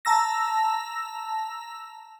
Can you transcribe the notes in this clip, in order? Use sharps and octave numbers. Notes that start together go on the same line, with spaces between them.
A5 A#5 E6 A#6